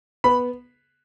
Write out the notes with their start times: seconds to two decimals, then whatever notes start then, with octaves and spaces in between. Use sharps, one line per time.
0.24 B3 B5